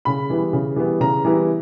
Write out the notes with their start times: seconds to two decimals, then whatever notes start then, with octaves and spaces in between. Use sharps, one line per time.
0.05 C#3 B5
0.30 E3 G3 B3 E4
0.53 C#3
0.76 E3 G3 B3 E4
1.00 C#3 A#5
1.25 E3 G3 B3 E4